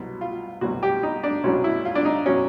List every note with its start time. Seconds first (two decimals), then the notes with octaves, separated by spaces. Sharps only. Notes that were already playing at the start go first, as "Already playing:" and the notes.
Already playing: C2 B2 F#3
0.21 F4
0.61 C2 B2 F#3 F#4
0.83 G4
1.03 D#4
1.23 D4
1.44 C2 B2 F#3 C#4
1.64 E4
1.85 F4
1.95 D4
2.05 D#4
2.26 B2 F#3 C#4